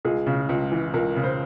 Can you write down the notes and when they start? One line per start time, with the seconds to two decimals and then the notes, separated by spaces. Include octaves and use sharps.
0.05 C#2 G#4
0.26 C#3
0.49 C#2
0.72 E3
0.94 C#2 A#4
1.16 C#3
1.24 C5